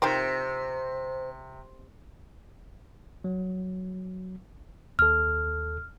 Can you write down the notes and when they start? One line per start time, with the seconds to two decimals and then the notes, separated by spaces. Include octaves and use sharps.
0.02 C3 D#3 F3 C4 C5
3.24 F#3
4.99 D#2 A4 F6